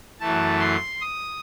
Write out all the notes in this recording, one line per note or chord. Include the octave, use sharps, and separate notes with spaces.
F#2 E3 A3 A5
C6
D#6